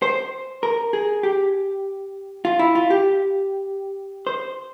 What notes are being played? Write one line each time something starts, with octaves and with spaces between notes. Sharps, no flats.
C5
A#4
G#4
G4
F4
E4
F4
G4
C5